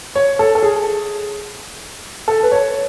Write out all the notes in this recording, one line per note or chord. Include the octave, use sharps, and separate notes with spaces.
C#5
A4
A4
G#4
A4
B4
C#5